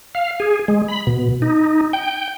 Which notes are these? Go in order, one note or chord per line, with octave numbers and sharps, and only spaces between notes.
F5
G#4
G#3
B5
B2
D#4
G5